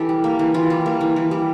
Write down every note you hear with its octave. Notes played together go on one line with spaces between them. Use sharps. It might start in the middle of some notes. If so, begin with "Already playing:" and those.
Already playing: E3 E4 G4 A4
G3
A#3
E3
E3 F4
G3
A#3
E3
E3
G3